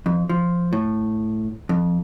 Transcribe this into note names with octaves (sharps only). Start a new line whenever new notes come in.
F2
F3
A2
F2